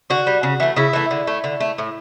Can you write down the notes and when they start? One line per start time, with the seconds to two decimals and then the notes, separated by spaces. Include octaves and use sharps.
0.10 D3 F#4
0.27 G3
0.43 C#3
0.60 E3 A3
0.76 C#3 E4
0.93 E3 A3
1.11 D3
1.27 A3
1.44 D3
1.60 A3
1.78 A2